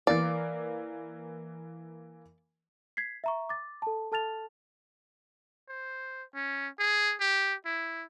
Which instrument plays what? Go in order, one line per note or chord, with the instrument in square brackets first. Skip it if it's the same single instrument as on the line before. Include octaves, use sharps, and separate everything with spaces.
[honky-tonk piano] E3 A#3 F5 [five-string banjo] D5
[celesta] G#6 B6 C7
E5 A#5 C#6
D6 A6
A4 A5
A4 A5 F6 A6 F7
[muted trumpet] C5
C#4
G#4
G4
E4